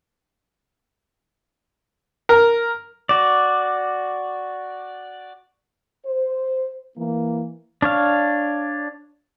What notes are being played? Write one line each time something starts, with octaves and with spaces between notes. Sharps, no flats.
A#4
F#4 D5
C5
E3 A#3
D4 C#5 F5